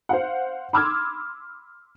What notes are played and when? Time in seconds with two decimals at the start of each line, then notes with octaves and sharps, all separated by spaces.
0.09 C5 F5 F#5
0.73 B5 C6 D6 E6 F6 G#6